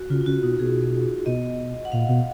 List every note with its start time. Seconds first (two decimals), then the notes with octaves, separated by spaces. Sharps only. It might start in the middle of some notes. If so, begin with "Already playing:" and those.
Already playing: F#4
0.10 C#3 F4
0.21 F4
0.26 C#3 F#4
0.43 B2 D#4
0.59 B2 G#4
1.26 B2 D#5
1.85 F#5
1.92 A#2 F5
2.09 B2